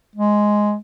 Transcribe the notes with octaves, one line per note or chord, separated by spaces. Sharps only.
G#3